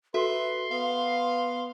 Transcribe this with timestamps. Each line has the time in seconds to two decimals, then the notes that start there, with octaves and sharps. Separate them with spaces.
0.14 F#4 A4 B4 E5 C6
0.71 B3 F5